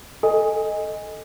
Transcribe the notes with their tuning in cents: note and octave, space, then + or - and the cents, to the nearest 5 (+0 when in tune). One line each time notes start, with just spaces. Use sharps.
A4 +0 D#5 +0 G#5 -15